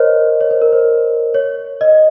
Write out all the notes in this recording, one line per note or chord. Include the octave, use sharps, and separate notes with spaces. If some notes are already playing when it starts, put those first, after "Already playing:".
Already playing: A#4 C5 C#5 D#5
C#5
C5
A#4
C5
C#5
D#5